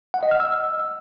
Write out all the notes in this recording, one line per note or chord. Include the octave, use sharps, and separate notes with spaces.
F#5
D#5
F6
E6